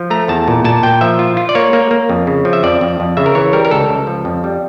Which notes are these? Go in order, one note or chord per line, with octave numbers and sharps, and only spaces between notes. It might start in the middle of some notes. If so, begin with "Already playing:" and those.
Already playing: F3
A3 A#5
E2 A5
A#2
A#2 A5
A#2 G5
F3 E5
F4
F4
D5
A#3 C#5
A#3
A#3
F2
C#3
F3
E5
F2 D5
F2
F2
C#3 E5
A#4
E3 C#5
G3 A#4
A#4
C#2 A4
C#2
F3
F2
G3